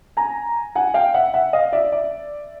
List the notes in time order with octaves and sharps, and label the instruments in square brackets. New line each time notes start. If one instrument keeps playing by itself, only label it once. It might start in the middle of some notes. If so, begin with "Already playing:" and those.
[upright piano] G#5 A#5
F#5 G#5
F5 G5
E5 F#5
E5 F#5
D#5 F5
D5 E5
D5 E5